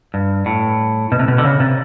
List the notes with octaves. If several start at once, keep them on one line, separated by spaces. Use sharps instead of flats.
G2
A2
B2
C3
B2
D3
C#3
C3